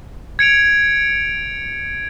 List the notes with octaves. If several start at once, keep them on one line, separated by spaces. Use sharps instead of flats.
G#6 C#7 D7 F7